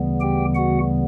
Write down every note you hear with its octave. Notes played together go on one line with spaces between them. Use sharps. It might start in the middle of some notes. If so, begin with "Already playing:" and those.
Already playing: D2 C#3 E3 G3 B3
G4 G5
F#4 F#5